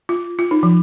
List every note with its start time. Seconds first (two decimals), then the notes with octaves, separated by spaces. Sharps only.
0.09 F4
0.39 F4
0.51 D#4
0.63 F3